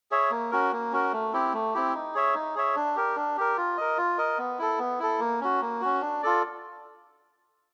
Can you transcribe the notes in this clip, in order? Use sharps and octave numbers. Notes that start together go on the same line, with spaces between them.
G#4 C#5 E5
A#3
C#4 F#4 A#4
A#3
C#4 F#4 A#4
A3
C4 E4 G4
A3
C4 E4 G4
D#4
G#4 C#5 E5
D#4
G#4 C#5 E5
D4
G4 A#4
D4
G4 A#4
F4
A#4 D#5
F4
A#4 D#5
B3
E4 A4
B3
E4 A4
A#3
C#4 F#4
A#3
C#4 F#4
D4
F4 A4 D5